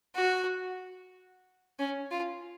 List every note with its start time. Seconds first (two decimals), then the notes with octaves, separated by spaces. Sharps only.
0.15 F#4
1.79 C#4
2.11 F4